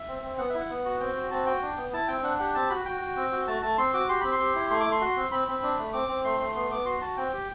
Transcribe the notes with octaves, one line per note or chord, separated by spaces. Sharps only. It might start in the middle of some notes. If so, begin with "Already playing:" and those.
Already playing: E5
C4
C4
B3 F#5
E4 E5
F#5
B3
F#4
C4 G5
F#4
C4 A5
F#4 G5
D4
B3
E4 A5
C4 G5
D4 F#5
G4 F#5
C4 A5
F#4 B5
F#4 G5
F#4
C4
F#4
A3 A5
A3 A5
C4 C6
F#4 D6
G4 C6
C4 B5
C6
G4
E4
A3 C6
D6
A3
C6
F#4
C4
C4 B5
C4
D4
A3
C4 D6
C4
A3 C6
A3 C6
B3 C6
B3 D6
F#4 C6
F#4 A5
C4 G5
G4